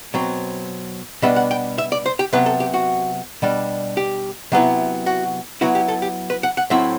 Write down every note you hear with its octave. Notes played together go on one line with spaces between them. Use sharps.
B2 F#3 C4
B2 G3 B3 D4 E5
F#5
G5
E5
D5
C5
G4
C3 F#3 B3 B4
A4
G4
F#4
B2 G3 D4
G4
C3 F#3 B3 E4
F#4
F#3 B3 E4 F#4
G4
A4
G4
B4
F#5
F#5
A2 F#3 C4 E4 E5